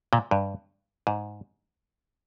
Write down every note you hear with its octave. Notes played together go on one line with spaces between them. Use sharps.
A#2
G2
G#2